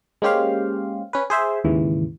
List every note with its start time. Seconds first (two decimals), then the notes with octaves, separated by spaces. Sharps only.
0.22 G#3 A#3 C#4 G4 C5 F5
1.13 C#4 B4
1.30 G#4 C5 E5
1.64 D#2 G#2 C#3 E3